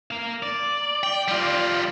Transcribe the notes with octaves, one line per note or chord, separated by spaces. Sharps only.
A#4 F5
D5
G5
G3 F4